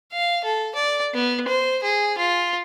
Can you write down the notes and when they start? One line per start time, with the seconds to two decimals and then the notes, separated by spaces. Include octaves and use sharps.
0.12 F5
0.44 A4
0.75 D5
1.14 B3
1.48 C5
1.83 G#4
2.18 F4